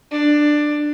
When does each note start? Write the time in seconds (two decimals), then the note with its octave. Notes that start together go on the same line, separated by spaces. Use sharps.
0.11 D4